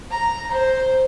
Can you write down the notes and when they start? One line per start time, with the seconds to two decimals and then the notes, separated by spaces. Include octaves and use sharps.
0.11 A#5
0.52 C5